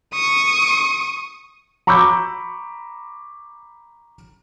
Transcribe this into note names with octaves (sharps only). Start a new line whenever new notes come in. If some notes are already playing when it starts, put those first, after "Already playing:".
C#6 D#6
A#5 B5 C#6 D6 E6 G6